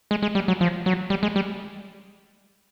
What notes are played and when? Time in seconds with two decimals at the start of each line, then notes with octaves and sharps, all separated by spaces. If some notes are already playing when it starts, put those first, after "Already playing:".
0.11 G#3
0.22 G#3
0.35 G3
0.48 F#3
0.61 F3
0.86 F#3
1.10 G3
1.23 G#3
1.36 G3